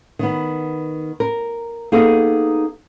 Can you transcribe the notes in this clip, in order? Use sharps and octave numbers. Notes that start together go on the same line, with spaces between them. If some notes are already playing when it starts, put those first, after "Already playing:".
D#3 B3
A#4
A#3 B3 D#4 G#4 A4